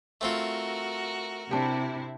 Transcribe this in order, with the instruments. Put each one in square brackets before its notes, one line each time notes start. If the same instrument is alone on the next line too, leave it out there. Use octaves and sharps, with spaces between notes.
[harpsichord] A3 C4 F4 [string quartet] F#4 A#4
[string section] C3 E4 [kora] D4 G4